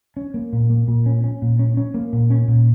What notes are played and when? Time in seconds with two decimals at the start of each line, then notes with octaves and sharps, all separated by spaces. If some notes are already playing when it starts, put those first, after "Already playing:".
0.17 C#4
0.34 A#3
0.53 A#2
0.70 A#3
0.88 A#2
1.06 C#4
1.24 C#4
1.42 A#2
1.59 C#4
1.77 C#4
1.94 A#3
2.13 A#2
2.30 C#4
2.48 A#2